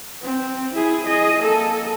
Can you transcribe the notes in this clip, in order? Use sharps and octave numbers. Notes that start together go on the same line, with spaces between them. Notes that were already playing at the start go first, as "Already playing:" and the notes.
C4
E4 G#4
G#4 D#5
A#3 A4